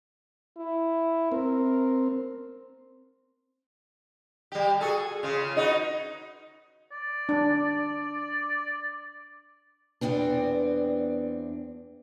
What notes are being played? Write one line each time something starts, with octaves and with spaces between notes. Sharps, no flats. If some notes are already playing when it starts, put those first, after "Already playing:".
E4
C4 A#4
G3 G4
F#4 G#4 A4
C#3 F4
D#4 F#4 B4
D5
D4
E2 G2 B3 C4 D4